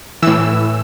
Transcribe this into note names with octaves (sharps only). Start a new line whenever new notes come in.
A2 E3 E6